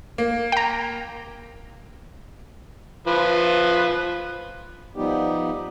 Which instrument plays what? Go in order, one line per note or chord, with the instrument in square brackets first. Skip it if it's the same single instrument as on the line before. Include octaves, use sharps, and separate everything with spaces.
[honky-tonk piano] A#3
[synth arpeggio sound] G5 A#5
[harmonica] F3 B4
[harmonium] F3 G3 B3 D#4 G4